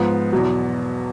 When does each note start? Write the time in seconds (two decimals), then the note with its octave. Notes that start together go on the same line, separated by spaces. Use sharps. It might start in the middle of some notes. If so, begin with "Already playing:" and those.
Already playing: G#2 F3 B3
0.32 E2 B2 F#3